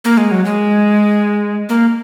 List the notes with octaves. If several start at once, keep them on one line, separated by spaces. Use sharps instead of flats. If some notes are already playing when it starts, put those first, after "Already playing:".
A#3
G#3
F#3
G#3
A#3